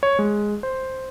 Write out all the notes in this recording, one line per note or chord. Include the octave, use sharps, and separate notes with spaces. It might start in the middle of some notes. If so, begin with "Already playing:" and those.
C#5
G#3
C5